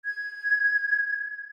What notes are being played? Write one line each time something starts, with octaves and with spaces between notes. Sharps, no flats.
G#6